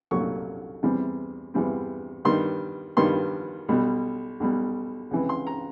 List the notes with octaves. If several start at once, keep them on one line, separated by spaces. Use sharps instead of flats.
C2 A#2 F#3 A3 C#6
E2 C3 E3 G3 C4
E2 C3 E3 G3 C4
G2 D#3 G3 B3 C6
G2 D#3 G3 B3 C6
B1 B2 G3
B1 B2 G3
C#2 C3 E3
C6
A#5